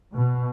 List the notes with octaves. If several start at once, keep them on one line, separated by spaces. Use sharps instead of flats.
B2